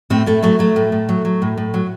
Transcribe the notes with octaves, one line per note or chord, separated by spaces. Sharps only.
A2 A3 C4
A2 A3
F#3 A3
F#3 A3
A2
A2
F#3
F#3
A2
A2
F#3